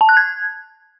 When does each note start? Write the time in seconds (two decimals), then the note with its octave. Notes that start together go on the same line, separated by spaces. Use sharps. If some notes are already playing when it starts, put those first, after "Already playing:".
0.01 A5
0.09 F#6
0.17 G#6